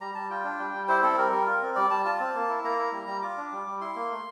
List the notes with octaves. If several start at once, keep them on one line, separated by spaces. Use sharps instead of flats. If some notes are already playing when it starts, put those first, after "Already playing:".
G3 A#5
G3 A5
F4 G5
D4
G3
G3
E4 C5
C4 A4
G3 A#4
G3
F4
C4
G3 D5
G3 A5
F4 A5
C4
A#3
E4
A#3 A#5
E4
G3
G3
F4 D6
D4
G3
G3
E4 C6
A#3
A3